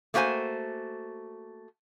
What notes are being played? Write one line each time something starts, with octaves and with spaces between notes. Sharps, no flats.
A3 A#3 F#4 C5 G#5